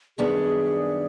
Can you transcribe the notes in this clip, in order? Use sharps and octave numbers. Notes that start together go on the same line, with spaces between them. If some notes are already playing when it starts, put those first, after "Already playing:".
F#2 D#3 G3 B3 D4 G#4